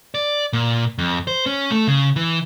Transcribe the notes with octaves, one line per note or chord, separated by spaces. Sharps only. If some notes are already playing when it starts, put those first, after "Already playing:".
D5
A#2
F2
C5
C#4
A3
C#3
E3